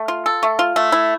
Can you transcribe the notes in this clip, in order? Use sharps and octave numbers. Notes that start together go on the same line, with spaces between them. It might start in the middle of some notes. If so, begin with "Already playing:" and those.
Already playing: A3
F4
A4
A3
F4
A3
E4